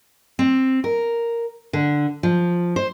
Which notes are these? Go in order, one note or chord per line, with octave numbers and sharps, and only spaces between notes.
C4
A#4
D3
F3
C5